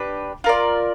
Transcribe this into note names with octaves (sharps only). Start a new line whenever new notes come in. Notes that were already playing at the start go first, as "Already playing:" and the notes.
Already playing: D4 G4 B4
F4 A#4 D5